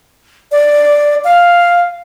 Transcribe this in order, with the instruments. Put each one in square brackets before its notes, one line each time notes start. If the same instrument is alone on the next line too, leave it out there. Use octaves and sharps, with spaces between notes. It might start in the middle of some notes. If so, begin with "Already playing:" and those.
[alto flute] D5
F5